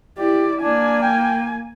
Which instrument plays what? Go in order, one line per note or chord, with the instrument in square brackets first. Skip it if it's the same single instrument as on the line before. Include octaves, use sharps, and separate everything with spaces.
[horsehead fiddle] E4 D5 [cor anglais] G4
[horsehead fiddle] A#3 G#5 [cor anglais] D4
[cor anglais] G5